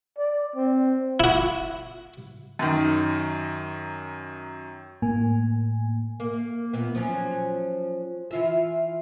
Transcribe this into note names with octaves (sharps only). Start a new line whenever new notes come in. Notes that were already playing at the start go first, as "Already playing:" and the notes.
D5
C4
E4 F#4
F#2 D#3
A2 A#3 G#5
A#3
A#2 B3
F3 F#3 C#4
E3 F4 E5